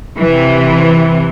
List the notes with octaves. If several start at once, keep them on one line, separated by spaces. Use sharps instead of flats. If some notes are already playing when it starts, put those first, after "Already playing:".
C3 E3